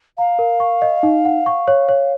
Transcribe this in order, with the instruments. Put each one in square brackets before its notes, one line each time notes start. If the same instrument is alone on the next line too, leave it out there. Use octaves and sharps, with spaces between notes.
[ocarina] F5 [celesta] A#5
[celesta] A#4
C#6
D#5
D#4
F#5
C#6
C#5
C#5